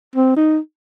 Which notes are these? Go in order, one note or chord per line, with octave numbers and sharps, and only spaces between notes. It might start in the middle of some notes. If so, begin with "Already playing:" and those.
C4
D#4